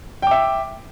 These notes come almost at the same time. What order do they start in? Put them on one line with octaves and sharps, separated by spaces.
G5 D6 E5